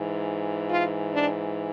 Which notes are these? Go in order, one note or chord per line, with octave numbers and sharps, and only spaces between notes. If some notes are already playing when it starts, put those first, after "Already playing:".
Already playing: G#2 E3
F4
D4